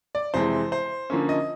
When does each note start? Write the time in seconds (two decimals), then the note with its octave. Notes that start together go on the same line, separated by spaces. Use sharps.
0.15 D5
0.34 F2 C3 E3 G#3 C5
0.72 C5
1.10 D3 F3 A#3 C#4
1.29 D#5